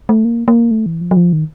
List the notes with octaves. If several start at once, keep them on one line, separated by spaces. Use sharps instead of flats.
A3
A#3
A#3
A3
E3
F3
F#3
F3
D#3